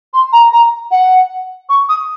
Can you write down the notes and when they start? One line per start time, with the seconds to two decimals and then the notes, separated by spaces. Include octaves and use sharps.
0.14 C6
0.32 A#5
0.52 A#5
0.91 F#5
1.69 C#6
1.89 D#6